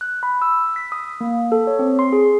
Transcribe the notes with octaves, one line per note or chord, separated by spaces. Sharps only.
F#6
B5
E6
B6
D#6
A#3
A4
C#5
C4
C6
G#4